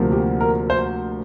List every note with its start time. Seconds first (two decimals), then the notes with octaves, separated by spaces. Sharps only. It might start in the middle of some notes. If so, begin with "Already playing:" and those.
Already playing: D2 C3 F3 A#3
0.12 G4
0.40 A#4
0.70 C5